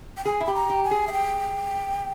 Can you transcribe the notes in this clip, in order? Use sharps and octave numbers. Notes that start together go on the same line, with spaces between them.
G5
G#4 G#5
E4
G4 B5
A#5
G4
G#5
G#4
E5
G5